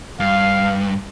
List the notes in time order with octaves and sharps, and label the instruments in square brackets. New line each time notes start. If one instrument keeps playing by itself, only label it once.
[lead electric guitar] G2 [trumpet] F5